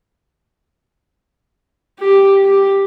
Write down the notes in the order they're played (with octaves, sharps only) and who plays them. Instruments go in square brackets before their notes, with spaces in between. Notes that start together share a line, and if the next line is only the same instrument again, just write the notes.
[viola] G4
G4